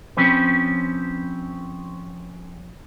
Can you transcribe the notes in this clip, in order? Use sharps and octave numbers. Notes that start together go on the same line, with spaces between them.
F3 C4 C#4 B4